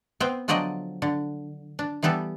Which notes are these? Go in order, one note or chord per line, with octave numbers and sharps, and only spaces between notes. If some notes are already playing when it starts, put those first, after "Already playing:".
B3 C4 C5 G5
D3 F3 F#3 D5 D#5 G5
D3
D4
E3 G3 B3 G4 A4